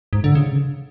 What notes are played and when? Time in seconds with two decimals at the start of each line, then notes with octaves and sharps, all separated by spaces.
0.13 G#2
0.24 D3
0.35 C#3